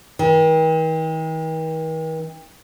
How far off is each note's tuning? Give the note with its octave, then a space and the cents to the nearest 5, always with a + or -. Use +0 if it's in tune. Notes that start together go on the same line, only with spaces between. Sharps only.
D#3 +45